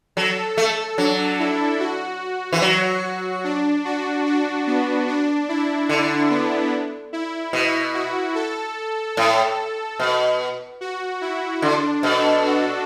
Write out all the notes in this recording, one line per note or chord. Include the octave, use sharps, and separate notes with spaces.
F#3 A4
A3
F#3 D4
E4
F#4
E3
F#3
D4
F#4
D4
B3
D4
E4
D3 D4
B3
E4
B2 E4
F#4
A4
A2 A4
B2
F#4
E4
D3 D4
B2 A4
F#4